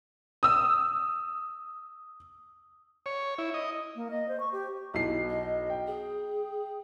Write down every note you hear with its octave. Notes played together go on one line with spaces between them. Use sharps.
D#6 E6
C#5
E4
D#5
A#3
D#5
C5
C#6
G4
B1 E4 C7
D#5
G5
G#4